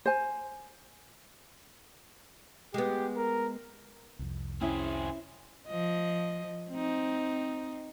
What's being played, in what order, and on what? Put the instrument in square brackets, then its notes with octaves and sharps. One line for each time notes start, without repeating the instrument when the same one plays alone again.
[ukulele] C5 G#5
[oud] G#3 B3 [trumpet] G4
[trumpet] A#4
[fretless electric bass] C2 F2
[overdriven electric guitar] C4 G#4 [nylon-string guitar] C#4 E4
[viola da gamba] F3 D#5
C4 D#4